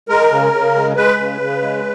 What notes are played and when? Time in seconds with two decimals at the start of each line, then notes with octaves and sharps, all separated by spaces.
0.09 G#3 A#4
0.31 C#3
0.53 C#3
0.75 G#3
0.96 G#3 B4
1.18 C#3
1.41 C#3
1.62 G#3